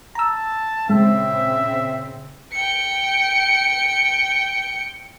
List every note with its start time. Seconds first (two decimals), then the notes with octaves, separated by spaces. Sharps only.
0.15 A5 A#5 E6
0.89 A#2 C#3 G#3 C4 E5
2.52 G5 C#7